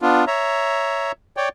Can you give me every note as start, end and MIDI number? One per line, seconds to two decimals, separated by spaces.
0.02 0.25 59
0.02 0.25 62
0.02 0.25 65
0.27 1.12 73
0.27 1.12 76
0.27 1.12 82
1.37 1.49 73
1.37 1.49 74
1.37 1.49 79